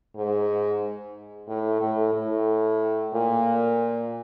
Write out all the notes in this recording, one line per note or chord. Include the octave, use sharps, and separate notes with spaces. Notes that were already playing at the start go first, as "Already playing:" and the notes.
G#2
A2
A2
A2
A#2